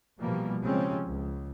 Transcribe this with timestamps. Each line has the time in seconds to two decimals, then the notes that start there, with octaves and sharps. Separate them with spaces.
0.19 B2 E3 F3 G3 A#3
0.62 C#3 F3 G3 G#3 C4 C#4
1.05 C#2